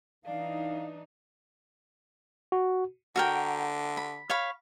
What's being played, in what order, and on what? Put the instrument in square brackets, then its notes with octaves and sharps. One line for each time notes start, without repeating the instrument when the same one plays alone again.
[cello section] E3 D#4 [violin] D4 [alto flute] F5
[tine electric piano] F#4
[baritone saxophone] D3 [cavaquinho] F#4 A#4 G5
[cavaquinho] B5
C#5 F5 B5